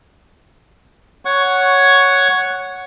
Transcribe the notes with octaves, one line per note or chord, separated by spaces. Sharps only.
C#5 F#5 C#6